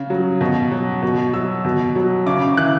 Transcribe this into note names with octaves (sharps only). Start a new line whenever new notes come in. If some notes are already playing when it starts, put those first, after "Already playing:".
Already playing: C#3
F#3
B2
F#3
B2
F#3 E6
B2
F#3
C#3 D6
D6
E3 F#6